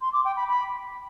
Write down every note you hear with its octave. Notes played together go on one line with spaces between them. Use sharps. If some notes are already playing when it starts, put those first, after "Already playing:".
C6
D6
G5
B5
B5